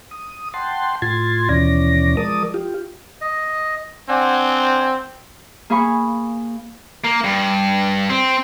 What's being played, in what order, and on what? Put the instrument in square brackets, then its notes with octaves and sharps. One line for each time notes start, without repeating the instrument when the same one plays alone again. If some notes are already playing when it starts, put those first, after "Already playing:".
[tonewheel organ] D#6
F#5 G5 A5 C6
A2 F4 C6 G#6 A6
D#2 B2 E3 C#4 D5 A#6
F3 G#3 A#4 D5 A5 D#6
F4 G4
[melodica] D#5
[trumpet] C4 [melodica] D4 F#5 G#5
[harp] A#3 G#4 F5 G#5 B5 C#6
[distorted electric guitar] A#3
G2
C4